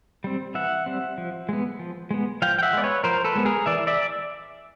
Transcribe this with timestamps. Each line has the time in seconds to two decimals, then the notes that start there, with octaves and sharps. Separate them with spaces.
0.24 G3 C4
0.54 E3 E5 F#5
0.86 G3 C4
1.18 F3
1.49 G#3 B3
1.79 F3
2.11 G#3 B3
2.42 F3 F5 G5
2.59 G5
2.63 E5 F#5
2.73 G#3 B3 D5
2.83 B4 C#5
3.04 F3 A#4 C5
3.25 A4 B4
3.36 G#3 B3
3.45 G#4 A#4
3.66 E3 D5 E5
3.87 D5 E5